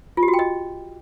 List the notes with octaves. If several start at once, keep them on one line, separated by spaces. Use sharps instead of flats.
F4
G4
F#4
G5
D#5